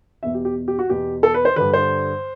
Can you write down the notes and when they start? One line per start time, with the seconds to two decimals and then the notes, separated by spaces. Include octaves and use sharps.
0.23 E2 B2 E5
0.34 G4
0.45 G4
0.68 G4
0.79 F#4
0.90 E2 B2 G4
1.23 A4
1.34 B4
1.45 C5
1.56 G2 D3 B4
1.74 C5